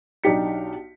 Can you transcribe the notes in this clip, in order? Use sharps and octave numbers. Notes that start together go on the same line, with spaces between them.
B1 D4 D#4 G4 B6 C#7